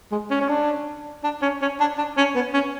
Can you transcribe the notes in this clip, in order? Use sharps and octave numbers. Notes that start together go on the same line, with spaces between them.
G#3
C#4
C#4
D4
D4
C#4
C#4
D4
D4
C#4
B3
C#4